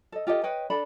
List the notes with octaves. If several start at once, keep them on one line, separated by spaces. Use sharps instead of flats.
A4 D#5
F4 G4 A4 D#5
B4 C#5 D#5 G5
D4 A4 B5